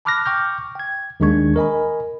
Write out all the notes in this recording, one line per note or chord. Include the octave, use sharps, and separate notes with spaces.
A5 B5 D6 F6 F#6 A#6
G5 C#6 D6 F6 G6
G5 G#6
D#2 D#3 G#3 D4 C#6 G#6
A#4 D#5 G#5 B5